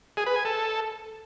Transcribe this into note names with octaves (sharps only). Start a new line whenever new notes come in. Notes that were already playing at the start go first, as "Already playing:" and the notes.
G#4
B4
G#5
A4